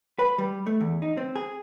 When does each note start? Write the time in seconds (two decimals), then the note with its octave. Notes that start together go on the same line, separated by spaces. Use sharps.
0.19 B4
0.38 G3
0.67 A3
0.81 E2
1.02 D#4
1.17 C4
1.36 G#4